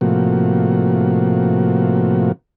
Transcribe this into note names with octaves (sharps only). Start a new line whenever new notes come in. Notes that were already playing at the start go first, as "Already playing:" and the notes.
A2 C3 F3 A#3 F#4